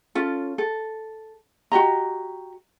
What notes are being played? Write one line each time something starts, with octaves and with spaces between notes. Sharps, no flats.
C#4 F4 A4
A4
F#4 G4 D#5 A#5